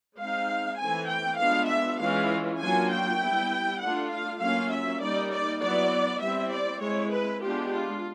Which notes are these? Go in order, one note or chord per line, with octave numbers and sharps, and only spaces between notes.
G#3 C4 D#4 F5
E3 A3 C4 G#5
G5
G#3 B3 D4 F4 F5
E5
E3 G#3 C#4 F4 F5
F#3 A#3 D4 F4 G#5
G5
G3 B3 E4
A3 D4 F4 F#5
F5
F#3 A#3 C#4 F4 F5
E5
G3 A#3 D#4 D5
D5
F#3 B3 E4 D5
G3 C4 E4 E5
D5
G#3 C4 E4 C#5
B4
G#3 B3 D4 F4 G4
F4